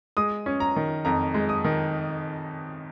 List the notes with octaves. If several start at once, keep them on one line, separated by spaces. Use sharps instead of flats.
G#3 D#6
C#4
A#5
D#3
F2 A#5
G#3
D#6
D#3